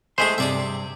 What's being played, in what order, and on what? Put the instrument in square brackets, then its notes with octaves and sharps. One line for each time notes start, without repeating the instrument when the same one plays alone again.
[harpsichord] G#3 A3 G#4 [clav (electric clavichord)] C5 [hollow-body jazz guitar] E5 G#5 C6
[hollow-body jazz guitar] G2 C3 [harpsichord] G#4 D5 E5